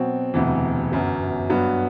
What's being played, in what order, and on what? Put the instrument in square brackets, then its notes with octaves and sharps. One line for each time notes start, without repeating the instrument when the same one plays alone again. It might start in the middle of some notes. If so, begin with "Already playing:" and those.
Already playing: [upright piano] B2 F#3 C4
E1 D2 C3 E3
G1 F#2 F#3
G2 F#3 B3